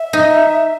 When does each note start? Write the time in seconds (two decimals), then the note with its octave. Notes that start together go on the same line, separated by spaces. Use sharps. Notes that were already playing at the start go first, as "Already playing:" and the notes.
Already playing: E5
0.13 D#4